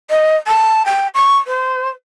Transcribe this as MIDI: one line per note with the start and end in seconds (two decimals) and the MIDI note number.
0.10 0.36 75
0.47 0.85 81
0.86 1.08 79
1.15 1.37 85
1.47 1.89 72